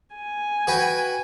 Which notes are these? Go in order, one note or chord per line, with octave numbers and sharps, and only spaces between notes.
G#5
F#4 B4 G5